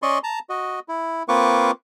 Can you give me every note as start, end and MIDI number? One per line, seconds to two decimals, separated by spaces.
0.02 0.18 61
0.02 0.18 74
0.02 0.18 75
0.02 0.18 84
0.02 0.18 85
0.24 0.39 81
0.24 0.39 82
0.50 0.79 66
0.50 0.79 75
0.89 1.23 64
1.29 1.71 58
1.29 1.71 60
1.29 1.71 65
1.29 1.71 71
1.29 1.71 85
1.29 1.71 86